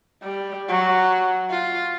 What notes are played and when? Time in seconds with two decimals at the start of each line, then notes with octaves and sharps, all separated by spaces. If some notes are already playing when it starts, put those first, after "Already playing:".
0.22 G3
0.69 F#3
1.50 F4